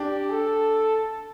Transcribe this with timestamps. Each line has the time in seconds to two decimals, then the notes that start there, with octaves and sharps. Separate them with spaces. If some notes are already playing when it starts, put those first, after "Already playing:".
Already playing: D4 G4
0.30 A4